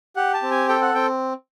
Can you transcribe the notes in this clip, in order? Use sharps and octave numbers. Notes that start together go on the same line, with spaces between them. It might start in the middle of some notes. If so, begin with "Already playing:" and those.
G4 F#5
A5
C4
G#5
A4 G5
F#5
C4 G5